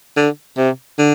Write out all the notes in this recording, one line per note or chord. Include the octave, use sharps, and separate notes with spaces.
D3
C3
D3